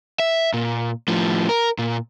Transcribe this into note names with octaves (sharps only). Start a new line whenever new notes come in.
E5
A#2
A2 F3
A#4
A#2